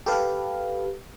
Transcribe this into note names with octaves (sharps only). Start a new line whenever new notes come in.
G4 A4 B4 F5